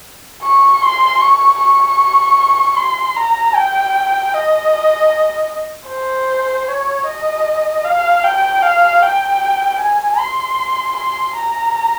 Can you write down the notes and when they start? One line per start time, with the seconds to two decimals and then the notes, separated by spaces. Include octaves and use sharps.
0.43 C#6
0.82 C6
1.21 C#6
1.60 C#6
2.77 C6
3.16 A#5
3.55 G5
4.34 D#5
5.89 C5
6.68 C#5
7.07 D#5
7.84 F5
8.24 G5
8.62 F5
9.02 G5
9.80 G#5
10.19 C6
10.97 C6
11.36 A#5